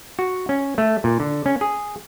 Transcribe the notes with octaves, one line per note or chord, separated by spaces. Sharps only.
F#4
C#4
A3
A#2
D3
C#4
G#4